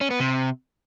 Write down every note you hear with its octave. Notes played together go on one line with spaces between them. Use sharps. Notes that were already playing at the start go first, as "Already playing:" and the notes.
C#4
B3
C3